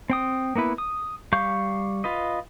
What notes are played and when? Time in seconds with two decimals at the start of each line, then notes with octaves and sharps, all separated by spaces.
0.10 C4 G5 D#6
0.56 A#3 B3 E4 B4
0.78 D#6
1.33 G3 F5 C#6 G6
2.04 F4 B4 D#5